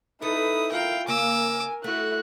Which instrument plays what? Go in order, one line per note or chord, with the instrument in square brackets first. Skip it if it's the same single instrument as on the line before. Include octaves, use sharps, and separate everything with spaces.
[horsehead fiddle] D#4 B4 [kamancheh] E4 [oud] A4 [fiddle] D#6
[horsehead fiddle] F4 F5 [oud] A#4 [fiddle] G5
[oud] C#3 A#3 [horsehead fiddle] A#4 [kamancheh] G#5 [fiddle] D6 E6
[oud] A3 [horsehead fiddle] E4 [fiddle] F#4 [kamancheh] F#6